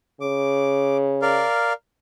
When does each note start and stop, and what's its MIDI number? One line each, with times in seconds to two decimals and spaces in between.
0.21 1.44 49
0.21 0.97 86
1.22 1.73 70
1.22 1.73 74
1.22 1.73 77